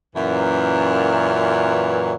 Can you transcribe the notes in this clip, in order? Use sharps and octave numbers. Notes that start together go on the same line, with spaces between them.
F#2 A#2 E3